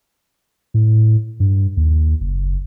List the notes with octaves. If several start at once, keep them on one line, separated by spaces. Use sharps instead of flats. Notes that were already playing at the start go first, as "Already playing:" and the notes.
A2
G2
D#2
F#1